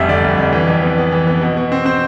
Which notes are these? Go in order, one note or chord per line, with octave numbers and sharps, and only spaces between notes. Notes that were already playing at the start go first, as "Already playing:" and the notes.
Already playing: F1 F2 G3 E5
D3 D5
F1
F2
E3
F2
B3
B3
E3
B3
B2
B2
C4
C4 C5